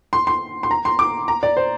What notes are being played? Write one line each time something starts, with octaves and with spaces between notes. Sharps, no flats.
C6
C6
C6
A#5
C6
D6
A#5
D5
C5